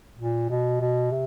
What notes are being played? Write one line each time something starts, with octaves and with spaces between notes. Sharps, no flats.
A#2
B2
B2
C3